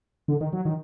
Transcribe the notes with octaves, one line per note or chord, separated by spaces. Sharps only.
D3
D#3
F#3
D#3